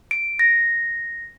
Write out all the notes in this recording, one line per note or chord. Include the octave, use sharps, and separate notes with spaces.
D7
A#6